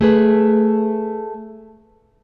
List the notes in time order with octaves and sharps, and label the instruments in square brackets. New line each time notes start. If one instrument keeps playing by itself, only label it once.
[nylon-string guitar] A3 G#4 B4